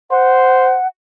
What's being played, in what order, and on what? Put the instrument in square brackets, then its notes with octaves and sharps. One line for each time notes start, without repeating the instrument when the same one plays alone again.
[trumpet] C5 [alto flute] F#5